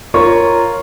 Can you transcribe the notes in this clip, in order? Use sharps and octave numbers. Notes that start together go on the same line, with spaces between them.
F4 A#4 C#5 A#5 C#6